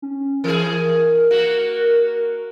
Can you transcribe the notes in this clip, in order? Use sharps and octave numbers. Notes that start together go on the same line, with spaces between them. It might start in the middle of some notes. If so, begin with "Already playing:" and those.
C#4
E3 G#4 A#4
A#3 F#4